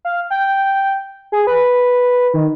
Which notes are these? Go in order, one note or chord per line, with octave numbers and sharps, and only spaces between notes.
F5
G5
G#4
B4
D#3